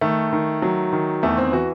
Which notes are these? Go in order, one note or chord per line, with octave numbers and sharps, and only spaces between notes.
D#3 A3
D#3
F#3
D#3
E2 A3
C4
E3 F#4